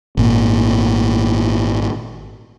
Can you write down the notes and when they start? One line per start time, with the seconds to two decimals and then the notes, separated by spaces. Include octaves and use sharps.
0.17 G#1 A#2